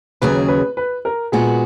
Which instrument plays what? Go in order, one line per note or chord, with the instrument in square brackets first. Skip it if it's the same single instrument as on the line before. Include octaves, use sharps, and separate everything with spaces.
[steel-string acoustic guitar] D#2 C#3 F#3 C#4 G#4 [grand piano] B4
[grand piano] B4
B4
A#4
[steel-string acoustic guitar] A#2 G#3 B3 F#4 [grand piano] G#4